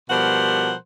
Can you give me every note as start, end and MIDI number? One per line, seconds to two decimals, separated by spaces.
0.10 0.74 47
0.10 0.74 53
0.10 0.74 55
0.10 0.74 70
0.10 0.74 72
0.10 0.74 78